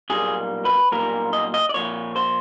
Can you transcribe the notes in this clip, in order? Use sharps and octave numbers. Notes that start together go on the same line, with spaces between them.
B1 A#2 G3 A#3 G#4
B4
B1 A#2 G3 A#3 A#4
D#5
D#5
D5
A#2 F3 A#3 C#5
C5